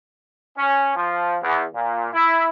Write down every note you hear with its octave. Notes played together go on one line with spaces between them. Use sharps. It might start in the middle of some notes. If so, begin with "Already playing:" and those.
C#4
F3
E2
A#2
E4